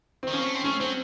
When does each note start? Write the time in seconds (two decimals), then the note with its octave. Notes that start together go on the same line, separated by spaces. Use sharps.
0.23 D#3 C4
0.33 F3 C#4
0.39 A#3
0.44 A3
0.54 C4
0.64 A3 C#4
0.80 F#3 C4